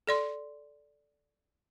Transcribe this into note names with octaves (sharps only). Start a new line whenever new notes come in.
A4 D5 C6